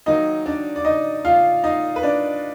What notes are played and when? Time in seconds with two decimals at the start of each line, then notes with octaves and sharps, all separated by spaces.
0.06 D#3 F#3 A#3 D#4 D#5
0.46 D4 D5
0.76 D5
0.85 D#4 D#5
1.25 F4 F5
1.63 D#4 D#5
1.96 B4
2.03 D4 D5